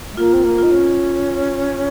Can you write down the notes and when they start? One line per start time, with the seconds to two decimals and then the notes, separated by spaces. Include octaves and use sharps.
0.13 G#3
0.17 A#3 F4
0.33 C4
0.44 A#3
0.58 D#4 F4
0.72 C#4